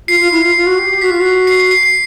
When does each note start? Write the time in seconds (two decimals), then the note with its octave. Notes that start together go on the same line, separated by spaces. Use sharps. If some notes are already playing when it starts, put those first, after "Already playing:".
0.08 F4 C7
0.19 F4
0.31 E4
0.43 F4
0.55 F4
0.66 F#4
0.77 G4
0.89 G4
1.01 F#4 B6
1.10 F4
1.20 F#4
1.47 C7
1.60 C7
1.71 C7
1.83 C7